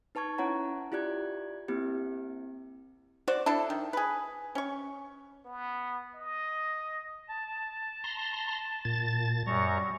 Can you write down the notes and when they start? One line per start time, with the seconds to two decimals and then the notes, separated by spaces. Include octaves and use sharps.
0.15 D#4 B4 A5 C#6 G#6
0.38 C#4 E4 C#5 F#5 A#5
0.92 E4 F4 G4 D5 F#6 G#6
1.68 A#3 C4 E4 G4
3.28 F#4 C5 D5
3.46 D4 E4 A4
3.70 D#3
3.93 G#4 B4
4.55 C#4 C#6
5.45 B3
6.14 D#5
7.29 A5
8.04 A#5 C6
8.85 A#2 A6
9.46 F#2 G3 A#5 C#6